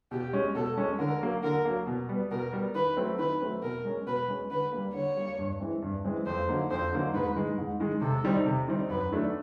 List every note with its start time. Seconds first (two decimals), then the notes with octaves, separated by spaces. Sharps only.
0.11 B2 G4
0.33 G#3 C#4
0.55 B2 A4
0.77 G#3 C#4
0.99 D3 A#4
1.21 F#3 A#3
1.43 D3 A#4
1.65 F#3 A#3
1.87 B2
2.09 G3 B3
2.31 B2 A#4
2.53 G3 B3
2.75 D#3 B4
2.97 F#3 A3 C4
3.19 D#3 B4
3.41 F#3 A3 C4
3.62 B2 A#4
3.85 G#3 C#4
4.07 B2 B4
4.28 G#3 C#4
4.51 D3 B4
4.72 G3 A#3
4.94 D3 C#5
5.16 G3 A#3
5.39 G2
5.60 E3 G#3 C4
5.82 G2
6.04 E3 G#3 C4
6.26 F2 C5
6.48 D3 F#3 A#3 D#4
6.70 F2 C5
6.92 D3 F#3 A#3 D#4
7.14 G#2 B4
7.36 D#3 G#3
7.58 G#2
7.80 D#3 G#3
8.02 C3 A4
8.24 D#3 G3 C4 D#4
8.46 C3
8.68 D#3 G3 C4 D#4
8.90 F#2 B4
9.12 D#3 F#3 A3 D4